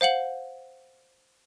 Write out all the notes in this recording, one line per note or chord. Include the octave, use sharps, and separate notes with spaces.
C5 F5 F#5 F#7